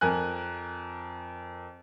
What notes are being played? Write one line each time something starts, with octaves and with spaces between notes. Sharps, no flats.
F2 A#4 G#5 F#6